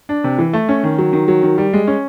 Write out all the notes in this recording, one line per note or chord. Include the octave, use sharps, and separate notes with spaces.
D4
C3
E3
A3
C#4
D#3
F#3
D#3
F#3
D#3
G3
G#3
C#4